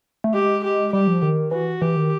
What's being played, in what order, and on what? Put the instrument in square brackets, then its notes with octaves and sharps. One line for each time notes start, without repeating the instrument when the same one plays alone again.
[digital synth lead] A3
[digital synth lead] G#3 [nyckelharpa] G4
[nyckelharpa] G4
[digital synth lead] G3 [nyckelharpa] G4
[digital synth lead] F3
D#3
[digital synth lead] E3 [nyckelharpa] F#4
[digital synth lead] E3 [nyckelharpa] G4
[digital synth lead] D#3